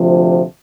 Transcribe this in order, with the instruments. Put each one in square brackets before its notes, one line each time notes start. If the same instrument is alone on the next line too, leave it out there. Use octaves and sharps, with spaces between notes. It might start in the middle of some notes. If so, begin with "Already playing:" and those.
Already playing: [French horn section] D2 C3 F3